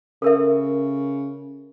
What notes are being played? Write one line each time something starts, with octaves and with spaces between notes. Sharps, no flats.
C#3 A4 A#4 E5